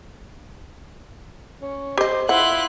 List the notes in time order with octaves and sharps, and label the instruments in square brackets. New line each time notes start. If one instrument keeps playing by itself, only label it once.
[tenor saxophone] C#4
[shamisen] G4 D#5 [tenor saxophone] C5
[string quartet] E4 F4 F#6 [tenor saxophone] E5 [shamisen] F#5